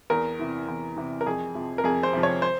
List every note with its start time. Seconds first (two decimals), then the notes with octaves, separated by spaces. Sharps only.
0.10 E2 A#4
0.39 C3 E3
0.68 E2
0.96 C3 E3
1.21 A#4
1.26 F2 G#4
1.55 C3 F3
1.78 A#4
1.84 F2 G#4
2.03 C5
2.13 C3 F3
2.23 C#5
2.42 C5